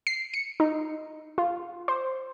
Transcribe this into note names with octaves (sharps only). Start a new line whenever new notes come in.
C7
C#7
D#4
F4
C5